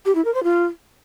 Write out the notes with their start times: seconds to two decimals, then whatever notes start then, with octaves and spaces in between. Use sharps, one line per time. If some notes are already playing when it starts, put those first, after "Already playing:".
0.05 G4
0.15 E4
0.25 A#4
0.34 C5
0.44 F4